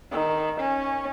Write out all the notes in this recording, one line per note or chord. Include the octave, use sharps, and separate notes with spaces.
D#3
C#4